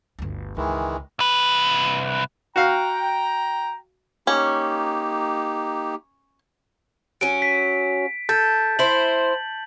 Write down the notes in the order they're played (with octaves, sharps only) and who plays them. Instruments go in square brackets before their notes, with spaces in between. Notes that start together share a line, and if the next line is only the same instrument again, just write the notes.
[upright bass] G1 D2
[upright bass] C#2 [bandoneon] D#3 E3 G#3
[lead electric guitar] C2 B4
[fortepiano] F#4 F5 [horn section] G5 A#5
[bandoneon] A#3 D#4 G4 [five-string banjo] C#4
[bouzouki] F#3 C#4 [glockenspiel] D7
[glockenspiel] B6
[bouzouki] A4 [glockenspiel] A5 G6 A6
[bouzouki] E4 C5 [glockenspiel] F#7